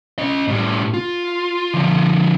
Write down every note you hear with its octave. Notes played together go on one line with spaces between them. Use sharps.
C#4 D#5
A2 G3
F4
D3 F3